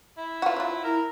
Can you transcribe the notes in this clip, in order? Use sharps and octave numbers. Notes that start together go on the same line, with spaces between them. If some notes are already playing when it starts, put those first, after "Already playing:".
E4
F4 F#4
F#3 F4
E4 A#4